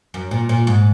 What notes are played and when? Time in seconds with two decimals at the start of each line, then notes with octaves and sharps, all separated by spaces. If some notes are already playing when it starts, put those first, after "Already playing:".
0.14 F#2
0.31 A#2
0.49 A#2
0.67 G#2